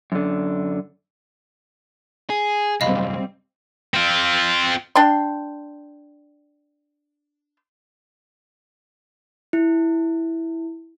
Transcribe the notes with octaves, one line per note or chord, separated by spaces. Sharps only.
F#2 D3
G#4
C2 F#2 G3 C4 D#5 F5 B5
C4 F4
D4 G5 C6
E4